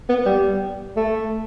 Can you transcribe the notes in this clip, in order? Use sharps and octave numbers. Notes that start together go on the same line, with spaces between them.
B3
G3
A3